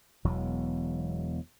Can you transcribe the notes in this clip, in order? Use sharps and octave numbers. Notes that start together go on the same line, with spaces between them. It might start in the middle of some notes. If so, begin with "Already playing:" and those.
E1 E2 F#3